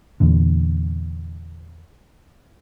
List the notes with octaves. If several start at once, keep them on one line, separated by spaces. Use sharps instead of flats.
E2 A#2 D3